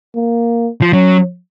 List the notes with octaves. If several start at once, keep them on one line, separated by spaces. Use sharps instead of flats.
A#3
F3
F#3 C#4